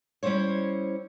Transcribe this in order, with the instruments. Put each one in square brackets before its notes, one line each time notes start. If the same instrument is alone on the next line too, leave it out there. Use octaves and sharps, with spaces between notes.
[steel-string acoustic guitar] G3 C#4 E4 C5 C#5